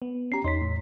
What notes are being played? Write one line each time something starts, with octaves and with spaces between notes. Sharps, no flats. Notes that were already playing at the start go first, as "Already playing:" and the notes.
B3
C#4 G4 A#5 C7
E2 D#4 C#5 C6 B6
A2